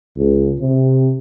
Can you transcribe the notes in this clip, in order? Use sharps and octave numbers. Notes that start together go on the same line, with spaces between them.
C#2
C3